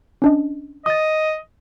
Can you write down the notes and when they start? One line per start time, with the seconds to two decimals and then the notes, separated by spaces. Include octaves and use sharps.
0.22 C#4 D4 D#5
0.86 D#5 D#6 A6